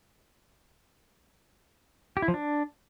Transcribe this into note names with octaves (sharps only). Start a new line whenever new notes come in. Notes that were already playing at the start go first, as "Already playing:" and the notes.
G4
E4
F3
D4